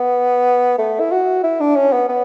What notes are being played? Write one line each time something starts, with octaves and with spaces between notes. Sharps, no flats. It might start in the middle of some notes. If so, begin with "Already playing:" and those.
Already playing: B3
A3
E4
F#4
E4
D4
C#4
B3
B3